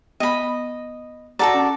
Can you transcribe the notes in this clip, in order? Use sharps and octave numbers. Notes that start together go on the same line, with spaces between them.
B3 D#5 B5
F#4 A4 D5 F#5 A#5
C#4